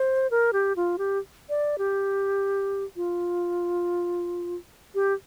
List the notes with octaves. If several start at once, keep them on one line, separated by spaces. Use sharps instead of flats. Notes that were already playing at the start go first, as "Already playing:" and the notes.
Already playing: C5
A#4
G4
F4
G4
D5
G4
F4
G4